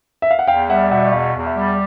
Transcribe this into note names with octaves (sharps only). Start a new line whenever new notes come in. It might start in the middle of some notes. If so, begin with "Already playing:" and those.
E5
F5
F#5
E2 F5 G5
G3 E5 F#5
B2 E5 F#5
E2 F5
E2
E5
G3